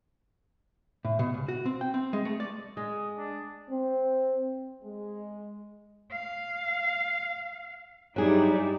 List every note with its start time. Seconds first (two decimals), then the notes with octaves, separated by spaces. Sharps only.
1.05 A2
1.19 B2
1.34 C#2
1.48 F#4
1.66 C4
1.81 G5
1.94 C4
2.13 G#3
2.25 A3
2.40 D5
2.77 G#3 D#6
3.17 D4
3.70 C4
4.82 G#3
6.11 F5
8.16 G2 F#3 D#4 E4 G4 G#4 D5